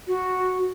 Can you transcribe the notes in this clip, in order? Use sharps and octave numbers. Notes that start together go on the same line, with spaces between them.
F#4